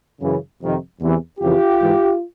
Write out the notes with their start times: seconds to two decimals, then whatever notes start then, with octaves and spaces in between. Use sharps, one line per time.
0.22 F#2 C#3 E3
0.61 F2 C3 D#3
1.01 E2 C3 E3
1.39 F2 C#3 E3 F4 G4
1.79 G#2 E3